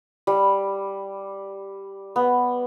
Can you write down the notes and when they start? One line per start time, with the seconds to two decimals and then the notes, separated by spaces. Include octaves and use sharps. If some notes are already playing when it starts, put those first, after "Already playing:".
0.27 G3
2.16 B3